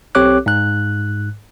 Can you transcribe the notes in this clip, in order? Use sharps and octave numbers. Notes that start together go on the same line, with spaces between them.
B1 C4 G4 C#5 D6 F#6
G#2 F#6